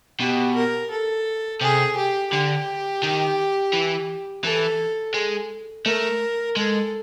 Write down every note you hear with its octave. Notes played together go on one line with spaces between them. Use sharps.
B2 G4
A#4
A4
C3 G#4
G4
D3 G4
D#3
E3
E3 A4
G#3
A3 A#4
G#3 A4